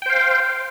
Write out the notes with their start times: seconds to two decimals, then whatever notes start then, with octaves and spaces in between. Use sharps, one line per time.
0.02 G5
0.06 C5
0.10 F5